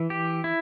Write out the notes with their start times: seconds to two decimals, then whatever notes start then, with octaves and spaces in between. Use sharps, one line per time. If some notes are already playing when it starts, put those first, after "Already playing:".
Already playing: E3
0.10 G4
0.44 E4